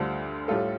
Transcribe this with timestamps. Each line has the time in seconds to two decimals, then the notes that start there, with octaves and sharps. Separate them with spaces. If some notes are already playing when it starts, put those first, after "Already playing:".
Already playing: D2 D3 G3 F4 C5
0.48 A2 G3 F4 A4